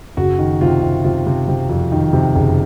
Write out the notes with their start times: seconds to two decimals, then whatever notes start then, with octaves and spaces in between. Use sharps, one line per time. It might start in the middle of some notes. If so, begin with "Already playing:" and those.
0.17 F#1 F#4
0.39 D#3
0.61 C3 F4
0.83 C3
1.04 C3 F4
1.26 C3
1.48 C3
1.69 F2
1.92 D#3
2.13 C3
2.35 F#1